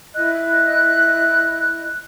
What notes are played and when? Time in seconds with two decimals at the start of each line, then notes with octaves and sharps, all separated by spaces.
0.15 E4 D#5 F#6